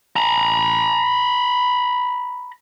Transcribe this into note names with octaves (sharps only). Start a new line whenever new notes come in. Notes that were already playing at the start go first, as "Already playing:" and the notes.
A#5 B5